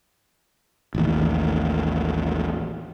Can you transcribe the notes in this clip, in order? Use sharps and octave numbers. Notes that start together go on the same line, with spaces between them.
A1 D#2